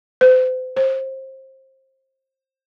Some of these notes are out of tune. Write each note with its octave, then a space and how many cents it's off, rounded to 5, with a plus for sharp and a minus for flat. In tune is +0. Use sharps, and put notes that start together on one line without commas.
C5 -40
C5 +25